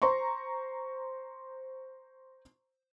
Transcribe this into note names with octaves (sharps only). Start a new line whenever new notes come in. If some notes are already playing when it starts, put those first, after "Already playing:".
C5 A#5 C6 C#6